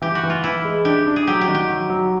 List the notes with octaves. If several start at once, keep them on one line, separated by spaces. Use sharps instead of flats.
E3 G4
F#4
E3
F4
E3 E4
G#3
D4 G4
D4
G#4
F#3 G4
G4
D#3
G4
F#3
F#3